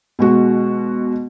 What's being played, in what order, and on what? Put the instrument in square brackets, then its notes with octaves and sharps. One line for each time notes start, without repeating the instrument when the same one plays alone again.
[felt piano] B2 G#3 F#4